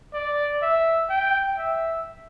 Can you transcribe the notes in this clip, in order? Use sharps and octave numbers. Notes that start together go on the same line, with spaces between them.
D5
E5
G5
E5